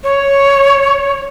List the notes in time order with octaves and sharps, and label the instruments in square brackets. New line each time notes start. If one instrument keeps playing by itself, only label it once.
[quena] C#5